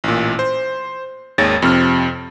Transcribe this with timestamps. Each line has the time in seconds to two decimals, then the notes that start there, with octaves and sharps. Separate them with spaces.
0.04 A1 A#2
0.39 C5
1.38 G#1 D#2 G#3 C#5 A6 A#6
1.62 F2 C3 C4 F6